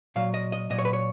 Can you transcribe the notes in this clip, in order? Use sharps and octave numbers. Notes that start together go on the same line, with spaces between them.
A#2 F#3 F5
D#5
D#5
A#2 F#3 D#5
C#5
B4
C#5